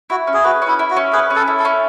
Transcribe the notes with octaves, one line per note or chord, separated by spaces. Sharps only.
E4 F#4
C#4
G#4
F#4 B4
C#4
E4
E4
F#4
C#4
G#4 B4
C#4
A4
E4
A4
C#4